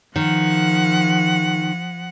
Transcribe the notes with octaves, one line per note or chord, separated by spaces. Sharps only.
D#3 F3 F#5